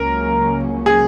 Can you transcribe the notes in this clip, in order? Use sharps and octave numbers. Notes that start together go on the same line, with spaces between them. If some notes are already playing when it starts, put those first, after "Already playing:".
Already playing: C#2 C#3 F#3 A#3 C#4 A#4
G#4